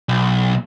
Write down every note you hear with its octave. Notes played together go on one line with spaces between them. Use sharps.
B1